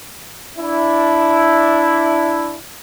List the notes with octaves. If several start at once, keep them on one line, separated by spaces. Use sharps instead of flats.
D4 E4